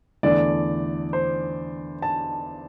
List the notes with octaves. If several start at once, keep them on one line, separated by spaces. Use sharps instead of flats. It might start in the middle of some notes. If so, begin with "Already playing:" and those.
E2 D3 A3 D4 D5
C5
A5